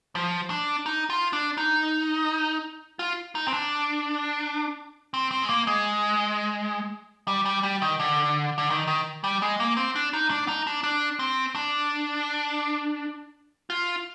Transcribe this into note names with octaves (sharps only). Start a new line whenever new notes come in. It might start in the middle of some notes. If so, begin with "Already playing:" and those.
F3
D4
D#4
F4
D4
D#4
F4
D#4
C4
D4
C4
C4
G#3
A#3
G#3
G3
G3
G3
D#3
D3
D3
D#3
D#3
G3
G#3
A#3
C4
D4
D#4
D4
D#4
D4
D4
C4
D4
F4